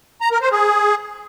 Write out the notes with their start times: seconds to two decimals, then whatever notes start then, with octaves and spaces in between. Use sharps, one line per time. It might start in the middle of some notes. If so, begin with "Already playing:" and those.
0.21 A#5
0.31 A#4
0.42 C5
0.52 G#4